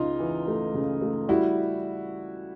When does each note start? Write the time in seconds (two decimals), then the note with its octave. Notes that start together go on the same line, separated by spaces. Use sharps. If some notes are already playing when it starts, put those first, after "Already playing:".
Already playing: C#2 C#3 D#4 F4
0.20 E3
0.47 A3
0.74 C#3
1.01 A3
1.28 G3 E4 F#4